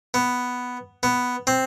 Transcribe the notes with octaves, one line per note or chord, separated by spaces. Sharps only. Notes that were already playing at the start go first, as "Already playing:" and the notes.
B3
B3
C4